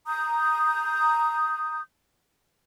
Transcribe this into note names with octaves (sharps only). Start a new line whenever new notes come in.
A#5 D#6 G6